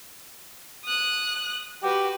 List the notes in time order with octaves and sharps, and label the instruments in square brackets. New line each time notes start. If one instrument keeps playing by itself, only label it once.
[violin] D#6 F#6
[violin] F#4 B4 [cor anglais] G4